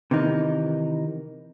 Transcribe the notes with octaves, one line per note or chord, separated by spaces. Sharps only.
C3 D#3 E3 D#4